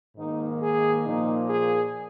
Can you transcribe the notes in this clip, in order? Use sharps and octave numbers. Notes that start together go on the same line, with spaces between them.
G#2 D#3 A#3 D#4
G#4
A#2 F3 A#3 D#4
G#4